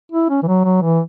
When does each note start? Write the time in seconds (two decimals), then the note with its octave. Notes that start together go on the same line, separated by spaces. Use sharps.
0.12 E4
0.29 C#4
0.42 E3
0.47 F#3
0.65 F#3
0.82 E3